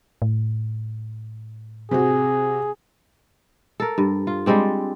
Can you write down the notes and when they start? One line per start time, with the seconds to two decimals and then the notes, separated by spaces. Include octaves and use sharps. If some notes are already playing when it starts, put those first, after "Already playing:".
0.22 A2
1.91 C3 C4 F#4 G#4
3.80 A4 A#4
3.98 G2
4.27 F4
4.46 G3 G#3 C4 D4